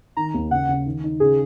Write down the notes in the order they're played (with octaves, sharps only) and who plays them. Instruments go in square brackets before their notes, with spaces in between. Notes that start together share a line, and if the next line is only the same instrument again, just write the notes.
[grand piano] D#3 [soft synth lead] A#5
[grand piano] D#2
[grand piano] C#3 [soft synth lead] F#5
[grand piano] C#3
D#3
D#4
[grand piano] C#3 [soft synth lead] G#4